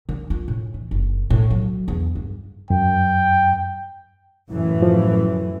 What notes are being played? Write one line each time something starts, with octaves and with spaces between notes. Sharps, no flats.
D#3
F4
A2
E3
F#1
A2
F#3
E2
G2
F#2 G5
F#2 A2 E3
F3